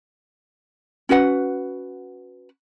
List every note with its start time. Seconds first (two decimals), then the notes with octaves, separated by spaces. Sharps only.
1.09 C#4 F#4 B4 F#5